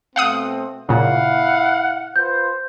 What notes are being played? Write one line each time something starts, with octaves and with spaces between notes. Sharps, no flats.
B2 A3 C4 F5 F#5 D#6
A#2 C#3 E4 F5 F#5
F4 B4 C5 G6